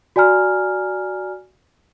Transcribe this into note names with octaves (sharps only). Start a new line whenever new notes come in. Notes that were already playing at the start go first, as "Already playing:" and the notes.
F#4 D5 G#5 A#5 F6